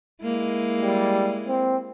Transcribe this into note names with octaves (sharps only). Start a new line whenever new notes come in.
G#3 A#3 E4
G3
C4